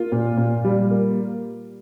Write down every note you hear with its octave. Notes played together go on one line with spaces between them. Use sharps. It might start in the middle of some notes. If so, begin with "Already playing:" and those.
Already playing: A#3 F4
A#2
A#2
G3
A#3